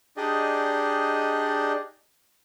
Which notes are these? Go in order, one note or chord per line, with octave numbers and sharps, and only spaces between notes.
D4 D#4 G4 G#4 D5 D#5